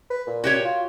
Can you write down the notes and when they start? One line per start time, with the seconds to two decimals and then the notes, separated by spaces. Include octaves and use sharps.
0.10 B4
0.27 A#2
0.44 F#4 G4 C#5
0.65 F4